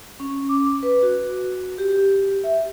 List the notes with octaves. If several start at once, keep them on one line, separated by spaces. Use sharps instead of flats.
C#4
D6
B4
F#4
G4
E5